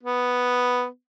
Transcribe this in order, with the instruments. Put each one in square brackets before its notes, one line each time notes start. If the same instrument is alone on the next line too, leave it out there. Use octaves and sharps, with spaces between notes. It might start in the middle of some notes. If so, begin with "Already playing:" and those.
[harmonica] B3